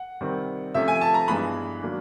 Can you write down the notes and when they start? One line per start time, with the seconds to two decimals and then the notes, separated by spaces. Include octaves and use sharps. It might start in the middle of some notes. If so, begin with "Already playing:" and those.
Already playing: F#5
0.21 C3 D#3 G3 C4
0.74 C3 F3 A3 C#4 E5
0.88 G#5
1.01 A5
1.14 A#5
1.28 G2 E3 G#3 B3 B5
1.82 D#3 F#3 A#3 D4